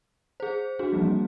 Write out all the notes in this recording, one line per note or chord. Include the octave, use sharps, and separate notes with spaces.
G#4 C5
D4 F#4 G#4
E3 F3 G3 A#3 C4